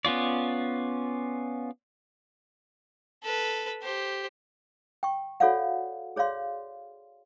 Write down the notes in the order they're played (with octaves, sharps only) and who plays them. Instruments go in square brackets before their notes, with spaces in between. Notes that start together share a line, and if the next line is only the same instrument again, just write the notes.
[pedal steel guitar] B3 C#4 F4 D5
[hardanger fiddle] A4 B4
G4 C5
[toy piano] G5 C#6
F#4 A4 C#5 D5 F5 F#5
G#4 C#5 D5 F5 C6